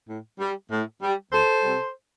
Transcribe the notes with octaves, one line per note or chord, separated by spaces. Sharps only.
A2
G3
A2
G3
D2 A4 C5
C3 G3